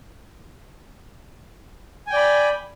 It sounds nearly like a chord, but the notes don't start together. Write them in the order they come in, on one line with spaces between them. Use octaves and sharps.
G#5 G5 D5 B5